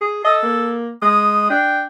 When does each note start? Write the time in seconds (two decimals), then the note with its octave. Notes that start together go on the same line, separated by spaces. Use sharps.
0.01 G#4
0.25 A4 D#5
0.43 A#3
1.02 G#3 D#6
1.50 D4 G5